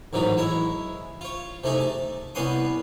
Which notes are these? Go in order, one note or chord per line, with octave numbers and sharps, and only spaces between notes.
A1 G#2 D#3 F#3 D#4
G#3 E4 C#5
F4 C#5
C3 A3 D#4 G#4
A5
C2 B3 C#4 F#5 C6 D#6